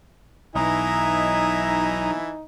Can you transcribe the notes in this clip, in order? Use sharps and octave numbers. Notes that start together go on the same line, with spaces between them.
B1 E3 D#4 D#5 E5 G#5 A#5 D#6